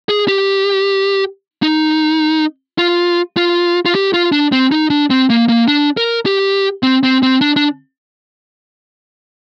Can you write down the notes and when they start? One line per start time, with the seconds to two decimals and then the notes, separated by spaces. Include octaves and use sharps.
0.09 G#4
0.28 G4
1.63 D#4
2.78 F4
3.37 F4
3.86 F4
3.95 G4
4.14 F4
4.32 D4
4.52 C4
4.72 D#4
4.90 D4
5.10 C4
5.30 A#3
5.49 A#3
5.68 D4
5.97 A#4
6.26 G4
6.83 C4
7.03 C4
7.23 C4
7.41 D4
7.56 D4